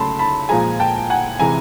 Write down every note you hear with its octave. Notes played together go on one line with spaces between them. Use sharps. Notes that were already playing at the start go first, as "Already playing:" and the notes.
Already playing: C#3 F#3 A3 A5 B5 C6
A5 B5
A#2 F3 G#3 G#5 A#5
G5 A5
F#5 G#5
C3 E3 G#3 G#5 A#5